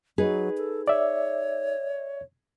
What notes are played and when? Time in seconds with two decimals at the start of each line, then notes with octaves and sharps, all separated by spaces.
0.18 F#3 D#4 G#4 B4
0.58 A4
0.88 C#5 D5 E5